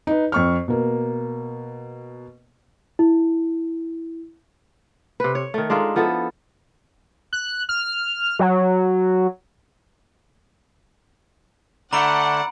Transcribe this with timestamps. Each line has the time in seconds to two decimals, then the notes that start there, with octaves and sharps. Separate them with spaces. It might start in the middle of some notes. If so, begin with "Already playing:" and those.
0.07 D#4 B4
0.32 F2 C#6 F6
0.68 B2 A#3
2.99 E4
5.20 C3 B4
5.35 C#5
5.54 D#3 A3
5.70 G#3 D4 D#4 F4
5.96 F3 B3 E4 A4
7.33 F#6
7.69 F6
8.39 F#3
11.93 D3 A3 D4 F#5 A#5 B5 D7